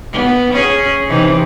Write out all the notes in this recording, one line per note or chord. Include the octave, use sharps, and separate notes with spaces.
B3
C#4 G#4
C3 E3 D#4